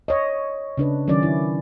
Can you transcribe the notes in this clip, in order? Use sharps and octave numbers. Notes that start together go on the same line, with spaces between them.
C#5 D#5
C#3 D4 B4
D#3 F#3 C#4 D5
E4